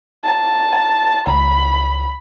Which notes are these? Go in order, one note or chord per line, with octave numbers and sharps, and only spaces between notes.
A5
C#2 B5